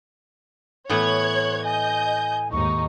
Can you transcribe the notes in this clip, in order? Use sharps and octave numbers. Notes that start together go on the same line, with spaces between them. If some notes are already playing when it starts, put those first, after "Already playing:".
A2 E3 B3 C#5 F#6 G#6
D#5 G#5 G6
D#2 G#2 D#4 C#6